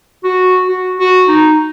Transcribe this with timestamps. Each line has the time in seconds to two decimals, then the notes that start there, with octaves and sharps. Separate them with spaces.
0.24 F#4
0.68 F#4
0.99 F#4
1.28 D#4